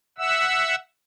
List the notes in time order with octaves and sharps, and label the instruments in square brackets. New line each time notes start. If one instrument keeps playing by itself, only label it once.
[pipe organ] E5 F#5 E6